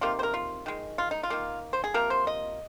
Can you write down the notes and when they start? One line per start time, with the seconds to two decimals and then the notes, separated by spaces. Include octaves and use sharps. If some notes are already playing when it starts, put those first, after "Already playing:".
0.01 C3 D#3 A#3 F4
0.19 C5
0.23 A#4
0.34 F4
0.66 D#3 G#3
0.98 F4
1.11 D#4
1.23 F4
1.30 D#3 A#3
1.73 C5
1.84 G#4
1.94 C3 F3 A#3 A#4
2.10 C5
2.27 D#5